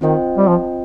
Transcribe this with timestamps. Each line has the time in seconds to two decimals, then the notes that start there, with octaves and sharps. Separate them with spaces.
0.01 D#3 C4 F4 C5 D#5 G5
0.38 G3
0.48 F3